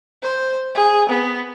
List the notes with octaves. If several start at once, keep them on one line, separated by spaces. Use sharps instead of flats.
C5
G#4
B3